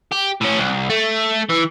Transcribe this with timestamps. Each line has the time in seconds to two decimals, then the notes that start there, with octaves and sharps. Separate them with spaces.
0.12 G4
0.41 A2 C#4
0.58 C2
0.90 A3
1.50 E3